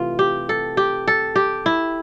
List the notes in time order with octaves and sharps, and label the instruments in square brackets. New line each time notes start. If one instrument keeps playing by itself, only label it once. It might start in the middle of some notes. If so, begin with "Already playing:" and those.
Already playing: [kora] C3 E3 A3 F4
G4
A4
G4
A4
G4
E4